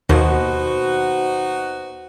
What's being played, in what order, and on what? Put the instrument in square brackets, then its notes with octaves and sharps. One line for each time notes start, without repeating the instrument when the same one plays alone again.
[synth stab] D#2 [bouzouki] B2 C5 [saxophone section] D#4 F#4